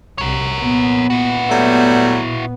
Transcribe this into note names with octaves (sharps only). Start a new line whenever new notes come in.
C2 A#4 C#5
A#2 B3
E4 F#4
F#3 G3 A3